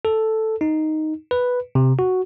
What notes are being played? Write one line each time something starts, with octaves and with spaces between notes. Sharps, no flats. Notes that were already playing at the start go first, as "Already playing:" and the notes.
A4
D#4
B4
C3
F#4